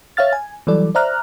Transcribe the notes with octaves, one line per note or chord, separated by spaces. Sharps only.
C#5 E5 F5 F6 A6
G#5
E3 F#3 G3 A4 D5
C5 D5 E5 A#5 F6 F#6